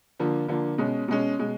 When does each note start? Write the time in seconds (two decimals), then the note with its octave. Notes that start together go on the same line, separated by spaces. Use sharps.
0.20 D3 F3 A#3
0.48 D3 F3 A#3
0.78 B2 G#3 C#4
1.08 B2 G#3 C#4
1.39 B2 G#3